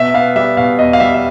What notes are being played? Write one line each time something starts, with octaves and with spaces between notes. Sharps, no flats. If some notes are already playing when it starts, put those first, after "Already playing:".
Already playing: B2 E5
B3 F5
G3 E5
B2 F5
E2 D#5
F5
G3 E5
E5